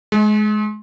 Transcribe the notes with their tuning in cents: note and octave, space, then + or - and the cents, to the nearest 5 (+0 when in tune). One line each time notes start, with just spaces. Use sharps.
G#3 +30